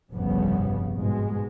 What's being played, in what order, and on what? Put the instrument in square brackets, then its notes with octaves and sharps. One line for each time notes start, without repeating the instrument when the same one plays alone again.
[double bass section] F1 A#1 G2 C#3 B3
G#2 B2 G#3